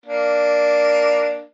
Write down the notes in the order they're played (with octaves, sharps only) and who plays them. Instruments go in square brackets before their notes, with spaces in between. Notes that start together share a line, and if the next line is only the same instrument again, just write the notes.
[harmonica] A#3 D4